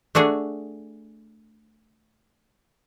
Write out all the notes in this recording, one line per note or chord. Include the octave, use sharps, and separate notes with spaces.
A3 D4 F#4 G#4